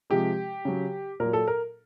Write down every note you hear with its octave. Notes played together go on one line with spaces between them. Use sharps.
C3 F3 G#3 G4
C#3 F#3
A#2 F#3 A#4
A4
A#4